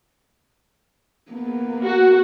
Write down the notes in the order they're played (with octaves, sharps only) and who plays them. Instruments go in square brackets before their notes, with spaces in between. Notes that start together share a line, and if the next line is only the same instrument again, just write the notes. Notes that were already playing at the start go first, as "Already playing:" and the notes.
[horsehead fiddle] A#3 B3
[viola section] F#4